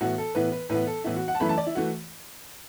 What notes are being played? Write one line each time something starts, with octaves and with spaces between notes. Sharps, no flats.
A2 E3 B3 F#4
A4
A2 E3 B3 B4
B4
A2 E3 B3 B4
A4
A2 E3 B3 E4
F#4
F#5
A5
F#2 E3 A3 B5
A5
D5
E4
E3 A3 F#4